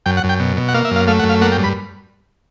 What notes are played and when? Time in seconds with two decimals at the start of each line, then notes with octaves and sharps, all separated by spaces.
0.06 F#2 G5
0.17 F#5
0.24 F#2
0.29 G5
0.39 B2
0.57 B2
0.68 F#5
0.74 A#3 F5
0.85 E5
0.91 F#2
0.96 F5
1.07 A3 F5
1.19 F#5
1.24 F#2
1.29 F5
1.41 A#3 F#5
1.52 G5
1.58 G2
1.64 B5